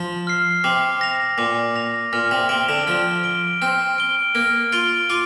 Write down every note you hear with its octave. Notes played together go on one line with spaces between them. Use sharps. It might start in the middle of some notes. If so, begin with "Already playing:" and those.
Already playing: F3
F6 C7
C3 D6
A#6 F7
A#2 D6
A#6 F7
A#2 F6
C3
C3 D7 G7
D3
F3 F6
D7 G7
C4 F6
D7 G7
A#3 F6
F4 D7 G7
F4 D6